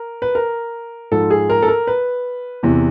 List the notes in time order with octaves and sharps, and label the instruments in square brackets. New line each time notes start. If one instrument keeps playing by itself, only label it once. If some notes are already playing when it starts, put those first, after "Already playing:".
Already playing: [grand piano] A#4
B4
A#4
G#2 F3 A4
G#4
A#4
A4
A#4
B4
E2 C3 E3